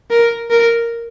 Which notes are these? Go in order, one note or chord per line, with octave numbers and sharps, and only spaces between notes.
A#4
A#4